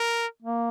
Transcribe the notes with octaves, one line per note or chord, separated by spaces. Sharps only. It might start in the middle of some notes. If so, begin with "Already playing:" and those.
Already playing: A#4
A#3